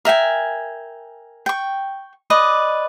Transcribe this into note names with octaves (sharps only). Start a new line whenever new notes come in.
A#4 E5 G5 G#5
G5 C#6
B4 D5 D#5